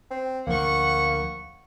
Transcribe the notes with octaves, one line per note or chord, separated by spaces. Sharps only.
C4
D2 F3 A#3 F#5 C#6